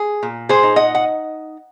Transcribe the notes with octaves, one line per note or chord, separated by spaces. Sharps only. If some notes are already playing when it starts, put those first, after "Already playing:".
Already playing: G#4
A#2
G#4 C5
D#4
D#5 F#5
F#5